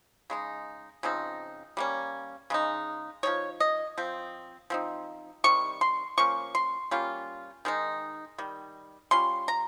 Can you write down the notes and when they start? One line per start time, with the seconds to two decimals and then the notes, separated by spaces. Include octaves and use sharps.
0.30 C#3 G#3 D#4
1.03 C#3 F3 C4 D#4
1.77 G3 A#3 C#4
2.50 C#3 G#3 D#4
3.23 F3 G#3 D#4 C#5
3.60 D#5
3.98 F3 C4
4.70 F3 C4 D#4
5.44 C3 D#3 G3 C#6
5.81 C6
6.18 F3 A#3 C#4 C#6
6.55 C6
6.91 G3 A#3 C#4 F4
7.65 D#3 G#3 D#4
8.38 D#3 G3
9.11 G3 C#4 F4 C6
9.48 A#5